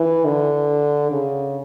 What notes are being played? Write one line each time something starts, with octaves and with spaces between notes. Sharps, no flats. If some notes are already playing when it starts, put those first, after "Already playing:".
Already playing: E3
D3
C#3